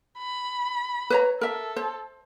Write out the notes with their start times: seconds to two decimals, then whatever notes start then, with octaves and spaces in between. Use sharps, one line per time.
0.18 B5
1.10 B4 C#5 A#5
1.41 A4 A#4 E5
1.76 C5